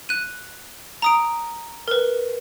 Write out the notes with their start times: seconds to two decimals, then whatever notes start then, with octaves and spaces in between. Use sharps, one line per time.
0.09 F#6 D#7
1.02 A#5 D#6 D7
1.88 A#4 B4